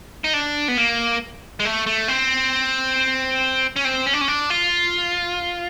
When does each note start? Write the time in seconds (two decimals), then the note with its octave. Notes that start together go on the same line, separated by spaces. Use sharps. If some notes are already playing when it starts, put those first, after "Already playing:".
0.24 D#4
0.34 D4
0.68 B3
0.77 A#3
1.60 G#3
1.65 A3
1.87 A3
2.08 C4
3.76 C#4
3.85 C4
4.06 C#4
4.13 D4
4.21 C#4
4.28 D4
4.50 F4